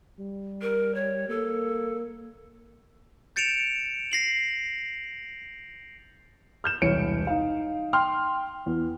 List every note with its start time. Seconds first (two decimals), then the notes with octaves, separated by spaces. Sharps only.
0.19 G3
0.62 A#4
0.95 C#5
1.29 A#3 A4
3.36 G6 A6 C#7 D7 E7 F7
4.12 A#6 C7 F#7
6.64 F6 G6 E7
6.82 E1 C2 C#5 C#7 D7
7.27 D#4 F5
7.93 G5 C6 F6
8.66 E2